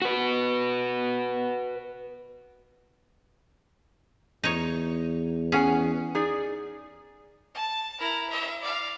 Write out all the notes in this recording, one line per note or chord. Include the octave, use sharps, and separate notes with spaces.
F#4 B4
E2 D#4 C#5
C#4 G#4 F#5 G#5
D#4 G#4 D5
A5
E4 A#4
E5
D5 F5